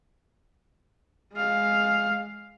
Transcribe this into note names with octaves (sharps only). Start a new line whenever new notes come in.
G#3 F5